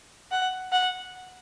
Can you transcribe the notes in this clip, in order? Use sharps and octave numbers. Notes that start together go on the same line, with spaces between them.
F#5
F#5